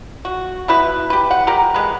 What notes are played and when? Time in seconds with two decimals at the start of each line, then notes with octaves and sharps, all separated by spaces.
0.25 F#4
0.68 B2 E4 B4
1.10 G4 B4
1.31 F#5
1.47 G4 A#4
1.74 G#3 B4